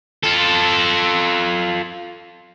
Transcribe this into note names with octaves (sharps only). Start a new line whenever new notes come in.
F4 A4